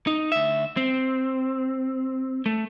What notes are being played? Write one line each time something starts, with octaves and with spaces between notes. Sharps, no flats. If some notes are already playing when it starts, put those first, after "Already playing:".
D#4
D2 E5
C4
A3